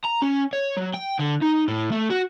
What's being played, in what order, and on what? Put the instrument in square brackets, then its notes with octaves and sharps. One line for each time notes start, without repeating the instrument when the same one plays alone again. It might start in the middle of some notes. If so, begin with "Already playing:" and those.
[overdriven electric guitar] A#5
C#4
C#5
F#3
G5
D3
D#4
A2
A3
F#4